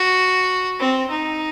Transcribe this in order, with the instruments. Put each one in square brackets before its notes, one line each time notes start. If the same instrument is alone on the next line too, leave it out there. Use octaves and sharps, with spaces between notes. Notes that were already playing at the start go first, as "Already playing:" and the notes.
Already playing: [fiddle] F#4
C4
D#4